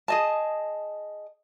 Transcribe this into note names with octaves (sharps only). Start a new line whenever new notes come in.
G#4 D#5 A5